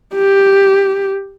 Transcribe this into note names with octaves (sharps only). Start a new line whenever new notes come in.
G4